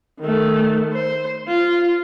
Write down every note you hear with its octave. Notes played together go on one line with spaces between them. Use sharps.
D#3 A3
C5
F4